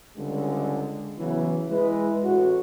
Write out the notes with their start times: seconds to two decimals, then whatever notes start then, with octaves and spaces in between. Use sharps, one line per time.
0.17 C#2 D3 G3 G#3
1.18 C#3 E3 F#3 B3 C#4 E4
1.71 G#3 E4 B4
2.23 A1 F#4